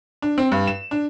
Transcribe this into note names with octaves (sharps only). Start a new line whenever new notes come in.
D4
C4
G2
E7
D4